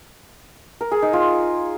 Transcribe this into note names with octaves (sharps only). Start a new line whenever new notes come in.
A#4
G#4
D#4
F4